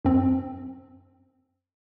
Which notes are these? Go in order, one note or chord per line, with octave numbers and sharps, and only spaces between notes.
F#2 C4